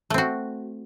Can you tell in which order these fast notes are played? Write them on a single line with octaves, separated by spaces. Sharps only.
A3 C4 F#4